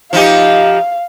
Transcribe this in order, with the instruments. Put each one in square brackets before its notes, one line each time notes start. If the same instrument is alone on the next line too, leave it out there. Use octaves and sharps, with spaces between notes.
[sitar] F3 D#4 G4 [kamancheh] F5